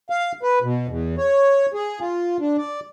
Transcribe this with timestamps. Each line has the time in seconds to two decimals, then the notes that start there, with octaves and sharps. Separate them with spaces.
0.10 F5
0.43 B4
0.62 B2
0.88 E2
1.18 C#5
1.74 G#4
2.00 F4
2.39 D4
2.58 D5